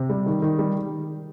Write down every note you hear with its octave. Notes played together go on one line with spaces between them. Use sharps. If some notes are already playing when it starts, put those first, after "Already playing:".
Already playing: C3
G3
D#3
D#3
G3